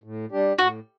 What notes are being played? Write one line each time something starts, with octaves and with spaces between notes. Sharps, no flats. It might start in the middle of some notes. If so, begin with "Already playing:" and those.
A2
G3 D4 G4
A2 F#4